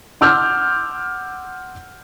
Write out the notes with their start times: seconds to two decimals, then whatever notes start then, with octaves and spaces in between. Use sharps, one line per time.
0.21 F#5 C6 D6 E6 F6 G6